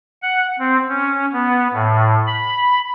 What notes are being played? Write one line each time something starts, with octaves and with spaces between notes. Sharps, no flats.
F#5
C4
C#4
B3
A2
B5